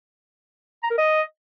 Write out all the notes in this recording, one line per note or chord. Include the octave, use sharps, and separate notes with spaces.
A#5
A#4
D#5